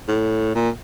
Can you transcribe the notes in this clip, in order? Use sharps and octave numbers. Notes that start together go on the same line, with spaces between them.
A2
A#2